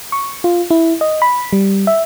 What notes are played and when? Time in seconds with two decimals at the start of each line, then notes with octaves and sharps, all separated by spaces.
0.12 C#6
0.44 F4
0.71 E4
1.01 D#5
1.22 B5
1.53 G3
1.87 E5